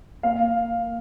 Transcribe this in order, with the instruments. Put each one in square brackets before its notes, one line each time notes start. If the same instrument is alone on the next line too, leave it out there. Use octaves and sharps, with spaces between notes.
[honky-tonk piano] A#3 F5